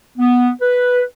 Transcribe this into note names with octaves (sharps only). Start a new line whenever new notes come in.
B3
B4